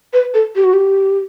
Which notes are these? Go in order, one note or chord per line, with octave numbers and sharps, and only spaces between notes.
B4
A4
G4
F#4
G4